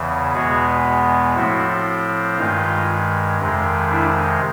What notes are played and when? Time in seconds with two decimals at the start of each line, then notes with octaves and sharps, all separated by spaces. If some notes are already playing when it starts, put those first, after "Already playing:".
Already playing: E2 C#3 E3
0.34 E2 B2 G#3 B3 F#4 G#4
1.35 A2 F3 A3 C4 E4 F#4
2.37 G2 D#3 G#3 D#4 F4
3.39 F2 C3 D#3 G#3
3.90 D4 E4